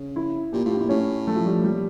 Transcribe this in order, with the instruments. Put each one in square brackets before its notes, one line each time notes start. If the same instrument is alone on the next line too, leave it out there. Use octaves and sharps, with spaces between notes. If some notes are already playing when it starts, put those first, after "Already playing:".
Already playing: [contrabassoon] C#3
[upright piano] E4
[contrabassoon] A#2 [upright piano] G4
[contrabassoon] A2 [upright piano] F4
[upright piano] G4
[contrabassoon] A#2 [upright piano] E4
[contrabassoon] A2 [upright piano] C#4
[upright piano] A3
F3
G3
[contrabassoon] A#2 [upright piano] G3